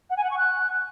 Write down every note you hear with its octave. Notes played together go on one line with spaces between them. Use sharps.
F#5
G#5
F#5
C#6
F#6